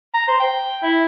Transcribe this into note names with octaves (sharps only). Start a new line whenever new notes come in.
A#5
C5
G5
E4